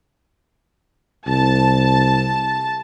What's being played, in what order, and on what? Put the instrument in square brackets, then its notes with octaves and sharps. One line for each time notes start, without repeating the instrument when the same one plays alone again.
[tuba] C2 [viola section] A5